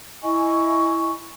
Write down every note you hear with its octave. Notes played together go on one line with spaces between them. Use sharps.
E4 D#5 G#5 C#6